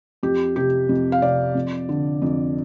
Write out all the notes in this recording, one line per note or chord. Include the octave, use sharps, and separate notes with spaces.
F2 G4
C3 G4
F2
F5
C3 D5
F2
D3
F2